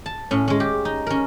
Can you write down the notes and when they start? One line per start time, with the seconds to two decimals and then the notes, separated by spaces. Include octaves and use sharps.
0.06 A5
0.31 A2 C#4
0.48 G#3 C#4
0.60 G4
0.85 D#4
1.07 C#4 A#4